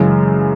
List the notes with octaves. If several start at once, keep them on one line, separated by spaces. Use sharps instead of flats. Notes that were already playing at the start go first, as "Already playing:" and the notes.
Already playing: F#2 C#3 E3 G#3